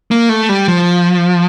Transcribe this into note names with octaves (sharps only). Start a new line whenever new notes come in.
A#3
A3
G3
F3